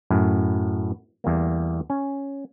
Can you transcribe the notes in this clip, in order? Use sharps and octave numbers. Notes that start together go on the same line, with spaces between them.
F#2 A2
E2 G3 A#3
C#4